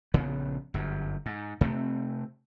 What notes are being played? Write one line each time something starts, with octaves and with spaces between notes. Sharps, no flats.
A#1 C#3 B3
G1 F#2
G#2
C3 A3 B3 C4